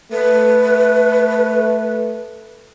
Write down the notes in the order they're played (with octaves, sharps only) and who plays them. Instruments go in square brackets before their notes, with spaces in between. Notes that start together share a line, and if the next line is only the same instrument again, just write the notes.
[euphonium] A3 [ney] B4